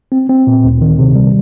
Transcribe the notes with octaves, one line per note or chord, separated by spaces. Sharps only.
C4
C4
A#2
D2
D#3
C3
G3